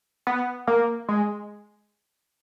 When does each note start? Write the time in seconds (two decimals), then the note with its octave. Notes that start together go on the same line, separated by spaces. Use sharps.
0.27 B3
0.68 A#3
1.09 G#3